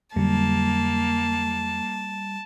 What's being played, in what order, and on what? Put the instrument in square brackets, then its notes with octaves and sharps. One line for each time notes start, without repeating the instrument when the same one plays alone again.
[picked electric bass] F2 D3 F#3 [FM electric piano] G3 [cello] A#3 [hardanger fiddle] A5